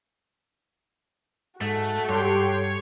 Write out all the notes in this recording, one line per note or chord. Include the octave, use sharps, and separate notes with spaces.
G#2 A3 F#4 A4
G2 G4 C#5 G5 C6